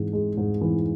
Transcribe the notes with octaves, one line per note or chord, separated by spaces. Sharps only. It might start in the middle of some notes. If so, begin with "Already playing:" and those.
Already playing: G#2 E3
G#3
G#2
E3